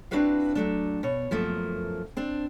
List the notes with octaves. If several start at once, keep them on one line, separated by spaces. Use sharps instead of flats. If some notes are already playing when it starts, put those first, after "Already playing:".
C4 D4 E4 F#4 B4 F5
F#3 A3 D4
B2 C#5
F#2 F3 A3 A#3
C4 D4